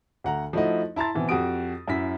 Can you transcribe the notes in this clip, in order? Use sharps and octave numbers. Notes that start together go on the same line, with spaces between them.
D2 F#5 A#5
F3 A3 D#4 E4 F#4 D#5
E4 A5 A#5 C6 A6
B2 E3 C4
F2 F#4 G4 D#6 D7
F#2 E4 B6